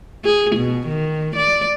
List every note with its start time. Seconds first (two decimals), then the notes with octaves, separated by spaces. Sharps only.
0.24 G#4
0.56 B2
0.87 D#3
1.36 D5